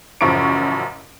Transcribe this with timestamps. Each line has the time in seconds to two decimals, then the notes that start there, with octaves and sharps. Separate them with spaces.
0.21 A1 F#2 C#3 F3 C#6 D7